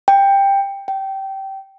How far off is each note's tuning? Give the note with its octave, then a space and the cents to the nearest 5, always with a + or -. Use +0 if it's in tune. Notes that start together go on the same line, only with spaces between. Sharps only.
G5 +15
G5 -20